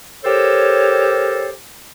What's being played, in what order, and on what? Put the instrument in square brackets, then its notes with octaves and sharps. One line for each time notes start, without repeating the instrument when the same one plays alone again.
[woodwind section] G4 A4 A#4 C5 C#5